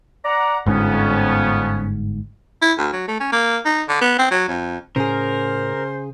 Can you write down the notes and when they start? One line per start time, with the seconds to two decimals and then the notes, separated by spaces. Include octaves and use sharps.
0.24 D5 F#5 A#5
0.66 G1 F2 G#2 B3 C#4
2.62 E4
2.78 D2
2.93 F#3
3.08 A3
3.20 C#4
3.32 A#3
3.65 D#4
3.89 D3
4.02 B3
4.19 C4
4.31 F#3
4.48 F2
4.96 A2 C#3 C#4 G#4 A#4 C5